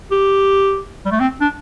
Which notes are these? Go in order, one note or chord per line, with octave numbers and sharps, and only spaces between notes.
G4
G3
A3
C4
D4